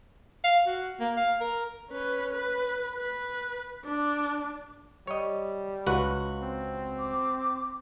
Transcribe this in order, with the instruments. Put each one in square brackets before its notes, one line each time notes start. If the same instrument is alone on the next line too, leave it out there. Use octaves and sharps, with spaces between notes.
[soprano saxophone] F5
F#4
A#3
F5
A#4
[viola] C#4 B4
B4
B4
D4
[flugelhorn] G3 [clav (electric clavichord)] C#5 D#5
[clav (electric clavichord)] C#2 B4 [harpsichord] F#4
[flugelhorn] C4
[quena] D6